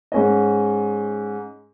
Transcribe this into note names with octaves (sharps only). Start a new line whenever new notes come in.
G#2 C#4 D#5